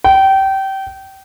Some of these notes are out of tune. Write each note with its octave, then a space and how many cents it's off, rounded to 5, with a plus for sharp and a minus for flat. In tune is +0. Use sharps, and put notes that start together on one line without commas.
G5 -25